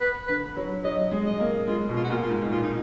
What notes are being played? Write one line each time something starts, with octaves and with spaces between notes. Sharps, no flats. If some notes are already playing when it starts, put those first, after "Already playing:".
B4
D3 B4
F#3
F#3 D#5
G#3
D#5
A#3
G#3 F4
B2
F4
F#4
A#2 F4
F4
G#2
A#2 F4
D#4